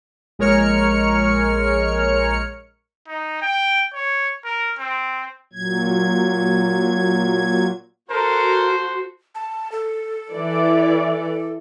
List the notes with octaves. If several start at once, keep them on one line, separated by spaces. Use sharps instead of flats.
A#1 G#3 A#4 C#5 F6 C#7
D#4
G5
C#5
A#4
C4
A#2 F#3 G#6
F#4 A4 A#4 C5
A5
A4
E3 D5